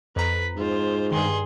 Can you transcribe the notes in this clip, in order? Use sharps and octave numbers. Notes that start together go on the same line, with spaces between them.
F2 B4 A#5 B6
G#2 F4 C5
G2 D#3 G#4 C6